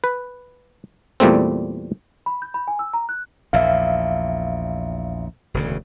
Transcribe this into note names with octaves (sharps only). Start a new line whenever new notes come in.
B4
E2 A#2 G3 A3 C4
B5
G6
B5
G#5
E6
A#5
F#6
A#1 E2 A#2 E5 F5
E1 D2 C#3